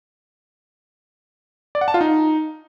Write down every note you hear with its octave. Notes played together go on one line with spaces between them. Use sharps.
D5
F#5
A5
F4
D#4